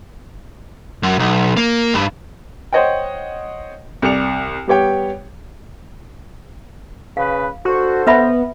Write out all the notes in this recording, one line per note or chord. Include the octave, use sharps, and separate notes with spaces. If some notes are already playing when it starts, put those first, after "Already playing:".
F#2
B1
A#3
G2
C5 C#5 D#5 F#5 G5
C2 D5 C#7 F7
G3 B3 G4 C#5 G5
C#3 B4 F5
D4 F#4 A4 C5
B3 B4 E5 B5